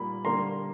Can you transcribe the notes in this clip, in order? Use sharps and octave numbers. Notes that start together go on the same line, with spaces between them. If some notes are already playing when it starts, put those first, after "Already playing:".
Already playing: A#2 G3 A#3 B5
D3 G3 A#3 A#5 C6